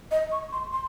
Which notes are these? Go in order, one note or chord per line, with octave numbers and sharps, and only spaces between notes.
D#5
C#6
C6
C6